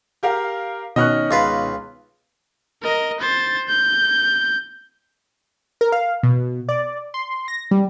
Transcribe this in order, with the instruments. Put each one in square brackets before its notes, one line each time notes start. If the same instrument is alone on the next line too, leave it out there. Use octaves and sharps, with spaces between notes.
[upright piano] G4 A#4 F5
[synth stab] B2 [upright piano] D#3 C#4 C#6 [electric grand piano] D#5 F6 F#6
[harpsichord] C#2 F4 B4
[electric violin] A#4 D#5
C5 A6
G6
[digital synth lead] A#4
F5
B2
D5
C6
A#6
G3